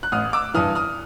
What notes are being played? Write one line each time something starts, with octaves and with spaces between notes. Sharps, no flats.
F#6
A1 D#6 F6
D6 E6
G2 E3 D#6 F6
D#6 F6